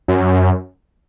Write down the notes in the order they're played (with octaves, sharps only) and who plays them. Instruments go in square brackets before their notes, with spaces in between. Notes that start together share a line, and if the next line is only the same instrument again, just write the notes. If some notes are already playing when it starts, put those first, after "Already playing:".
[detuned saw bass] F#2